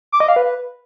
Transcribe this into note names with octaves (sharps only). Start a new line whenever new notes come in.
D6
D#5
F5
B4